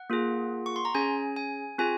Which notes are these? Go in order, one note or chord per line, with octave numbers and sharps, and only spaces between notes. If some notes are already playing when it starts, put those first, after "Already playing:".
Already playing: F#5
A#3 F4 G#4
C#6
C6
A#5
C#4 G#4 G#5
G#5
C4 F4 G#4 G#5